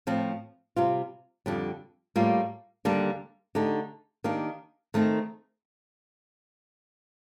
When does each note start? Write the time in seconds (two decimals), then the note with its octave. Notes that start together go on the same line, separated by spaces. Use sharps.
0.07 A2 F3 C4
0.76 C3 G3 C4 F4
1.46 F2 D3 G3
2.16 A2 G3 A#3 F4
2.85 D#2 D3 G3 A#3 D4
3.55 D3 A3 D#4 G4
4.24 D#3 A#3 D4 G4
4.94 D#3 A3 C4 D#4